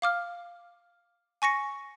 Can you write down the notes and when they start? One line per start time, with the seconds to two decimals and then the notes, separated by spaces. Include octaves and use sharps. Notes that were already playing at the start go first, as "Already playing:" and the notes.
0.02 F5 D6 F6
1.42 G#5 C#6 A#6 C#7